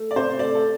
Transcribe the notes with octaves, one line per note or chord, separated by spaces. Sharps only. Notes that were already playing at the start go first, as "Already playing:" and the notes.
Already playing: A3
D5
C3 C5
A3 D5
A4